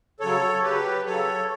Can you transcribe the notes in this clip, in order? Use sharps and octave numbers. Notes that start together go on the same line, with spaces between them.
C#3 F#3 A4 C#5
C#3 F#3 G4 B4
C#3 F#3 A4 C#5